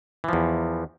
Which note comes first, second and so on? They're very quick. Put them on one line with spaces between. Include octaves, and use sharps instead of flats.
E3 F3 E2